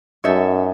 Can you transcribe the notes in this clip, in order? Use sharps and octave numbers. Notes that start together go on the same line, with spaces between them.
F#2 D#4 A4 C#5 E5